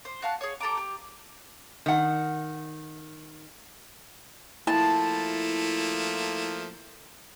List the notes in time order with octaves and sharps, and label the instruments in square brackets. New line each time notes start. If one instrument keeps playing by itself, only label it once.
[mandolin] C5
F#4 F5 A5 F#6
G#4 C#5
G4 A4 A#5 D6
G4
[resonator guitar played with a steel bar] D#3 F#5
[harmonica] F3 A3 A#3 [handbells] E4 [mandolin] A5